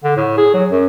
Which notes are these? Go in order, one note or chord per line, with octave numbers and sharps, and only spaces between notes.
D3
A2
G#4
F#3
F#2